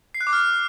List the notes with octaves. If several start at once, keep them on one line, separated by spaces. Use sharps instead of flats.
C7
F#6
D6
F6